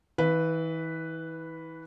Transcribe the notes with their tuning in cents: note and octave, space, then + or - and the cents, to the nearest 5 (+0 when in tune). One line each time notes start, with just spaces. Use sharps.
E3 -35 B4 +0 F5 +0